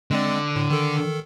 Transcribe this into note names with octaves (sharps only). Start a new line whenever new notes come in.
D3 G#3 C4 D5
A2
D#3 A4